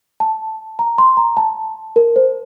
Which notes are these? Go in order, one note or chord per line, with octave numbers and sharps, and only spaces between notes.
A5
A#5
C6
A#5
A5
A#4
C5